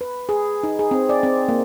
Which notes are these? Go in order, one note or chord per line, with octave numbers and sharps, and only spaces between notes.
B4
G#4
D#4
G#4
C4
D5
C4
A#3